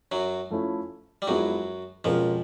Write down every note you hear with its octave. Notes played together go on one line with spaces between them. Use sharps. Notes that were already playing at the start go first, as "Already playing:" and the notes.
F#2 F#3
F3 A3 C#4 E4
G3
F#2 F3 F#3 G#3 B3 E4
F2 B2 F3 G#3 C#4 F4 A#4